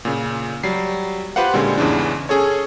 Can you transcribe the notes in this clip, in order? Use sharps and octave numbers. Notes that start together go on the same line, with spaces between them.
A#2 C#3
F#3 G3 C7
F4 G4 B4 C5 F5 F#5
A#2 D3 G3 G#3 C#4
E2 G#2 C#3 E3 D4
C#4 G#4 A4 C#5